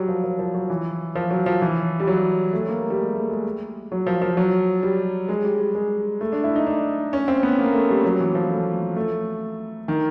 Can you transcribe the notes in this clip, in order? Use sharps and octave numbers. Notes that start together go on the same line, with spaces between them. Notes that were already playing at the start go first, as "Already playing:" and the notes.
Already playing: F#3 G3
F3
F3
F3
F#3
E3
F3
F#3
F3
E3
G3
F#3
A3
A#3
G3
G#3
A3
G#3
F#3
F3
F3
F#3
G3
G#3
G3
G3
G#3
A3
D4
E4
D#4
D4
C#4
C4
B3
A#3
A3
G3
F#3
E3
F3
A3
A3
D#3